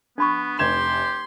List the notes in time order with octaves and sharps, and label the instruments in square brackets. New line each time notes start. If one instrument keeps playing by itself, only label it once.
[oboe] B3 [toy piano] D4 B5 C#6
[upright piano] F1 G#6 E7 [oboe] G4 [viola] C6